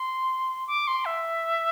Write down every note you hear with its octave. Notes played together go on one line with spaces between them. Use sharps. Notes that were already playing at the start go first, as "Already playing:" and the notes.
Already playing: C6
D6
C6
E5